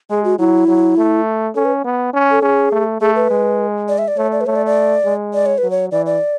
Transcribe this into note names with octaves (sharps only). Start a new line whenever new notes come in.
G#3 G#4
F#4
F#3 E4
F#3
A3
C#4 A4
B4
B3
C#4
A4
C#4 G#4
A3
A3 G#4
B4
G#3
D5
E5
D5
A3 C#5
D5
B4
A3 C#5
D5
D5
G#3
D5
C#5
B4
F#3
C#5
E3 D5
D5